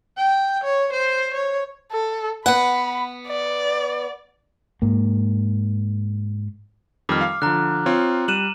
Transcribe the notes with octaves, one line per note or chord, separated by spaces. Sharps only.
G5
C#5
C5
C#5
A4
B3 F#5 B5
D5
G#2 A#3
F2 D#3 G3 D6 F6
F5
D3 F3 A#5 F#6
C4 F4 C#5
G3 F#6 D#7 E7 F#7